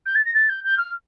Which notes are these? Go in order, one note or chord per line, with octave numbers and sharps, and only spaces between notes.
G6
A6
A#6
A6
G6
G6
F6